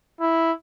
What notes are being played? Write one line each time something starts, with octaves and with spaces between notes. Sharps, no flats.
E4